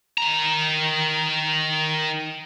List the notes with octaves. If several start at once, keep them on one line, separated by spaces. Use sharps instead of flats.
D#3 A#5